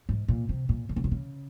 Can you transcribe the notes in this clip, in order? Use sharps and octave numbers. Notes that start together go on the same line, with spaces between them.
G#2
A#2
C3
A#2
D3
C#3
C3
C#3